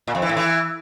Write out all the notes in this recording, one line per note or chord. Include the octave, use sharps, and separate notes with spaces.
A#2
F2
E3
A2
E3